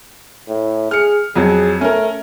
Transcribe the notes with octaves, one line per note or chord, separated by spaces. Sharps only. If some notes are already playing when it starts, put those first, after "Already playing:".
A2
G#4 F6 C#7
F2 F#3 G#4
A3 C#4 A#4